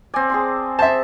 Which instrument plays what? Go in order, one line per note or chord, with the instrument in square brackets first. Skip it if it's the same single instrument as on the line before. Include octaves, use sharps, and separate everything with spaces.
[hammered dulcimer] C4 D5 [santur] G#5
[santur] G#4 A5 C6
[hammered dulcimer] C5 [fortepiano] E5 A5